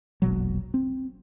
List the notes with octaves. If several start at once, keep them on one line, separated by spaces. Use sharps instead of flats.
E1 A#1 B2 F#3
C4